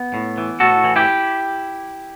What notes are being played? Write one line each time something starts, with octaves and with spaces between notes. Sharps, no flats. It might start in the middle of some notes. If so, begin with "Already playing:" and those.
Already playing: B3
A2
E3
A2 F#4 A4
E3
E4 G4